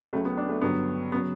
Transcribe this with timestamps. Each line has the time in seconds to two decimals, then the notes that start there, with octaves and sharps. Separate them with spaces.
0.13 C#2 C#3 F#3 A3
0.25 B3
0.37 D4
0.49 A3
0.61 G2 D3 F#3 B3
1.12 C#3 F#3 B3